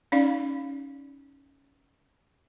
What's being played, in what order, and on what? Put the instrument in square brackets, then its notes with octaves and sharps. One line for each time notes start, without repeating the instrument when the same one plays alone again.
[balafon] C#4 D#4 D5 F5